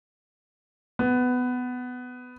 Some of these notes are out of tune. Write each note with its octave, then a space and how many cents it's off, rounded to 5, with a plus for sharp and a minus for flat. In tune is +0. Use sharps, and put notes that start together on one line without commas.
B3 +15